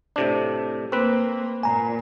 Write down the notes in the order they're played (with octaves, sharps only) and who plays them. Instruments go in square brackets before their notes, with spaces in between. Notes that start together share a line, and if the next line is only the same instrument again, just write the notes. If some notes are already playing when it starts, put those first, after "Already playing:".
[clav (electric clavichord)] A2 C3 D4
[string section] A#3 [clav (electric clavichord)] C4 B4
[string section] A#2 [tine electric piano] G#5 A#5